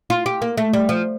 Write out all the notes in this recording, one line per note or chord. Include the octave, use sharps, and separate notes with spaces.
F4
G4
A#3
A3
G3
F3